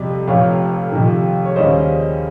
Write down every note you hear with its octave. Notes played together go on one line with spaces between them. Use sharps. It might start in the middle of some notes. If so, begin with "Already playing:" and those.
Already playing: F2 C3 G3 D#5
F1 F2 C3 C#5 F5
F2 C3 D#3
C#5
D#2 C#3 G3 A#3 C#4 C5 D#5